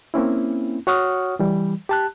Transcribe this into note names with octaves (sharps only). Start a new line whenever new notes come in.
A#3 C4 C#4 E4
F#4 C#5 F#5 C#6 D#6 F6
E3 G3
G4 A5 F#6